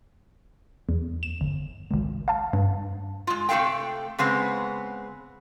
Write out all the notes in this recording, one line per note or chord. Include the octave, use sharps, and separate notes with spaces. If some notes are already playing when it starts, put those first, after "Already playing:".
E2
E7
G1
G#1 C#2
F5 A5
G2
G#3 F4
C3 A3 E4 A4 F5 G5
C#3 G#3 B3 C4